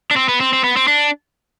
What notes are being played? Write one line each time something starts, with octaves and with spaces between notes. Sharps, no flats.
D4
C4
B3
C4
C4
B3
C4
D4